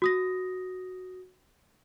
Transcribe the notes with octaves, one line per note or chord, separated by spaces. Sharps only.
F#4 D#6 A#6